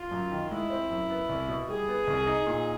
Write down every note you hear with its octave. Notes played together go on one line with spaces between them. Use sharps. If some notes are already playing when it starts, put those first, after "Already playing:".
Already playing: F4
F#2
D#3
G#3 E4
C4
F#2
B3
C2
B2
G3 G#4
B3
C2
D#4
A#2